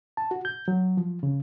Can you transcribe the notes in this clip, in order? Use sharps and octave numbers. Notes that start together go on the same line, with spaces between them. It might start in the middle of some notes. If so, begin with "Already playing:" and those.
A5
F#4
G6
F#3
F3
C#3